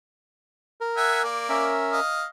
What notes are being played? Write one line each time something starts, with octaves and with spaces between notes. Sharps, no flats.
A#4
E5 F#5 G#5
A#3 D5
C#4 A#4 E5
D#5 F5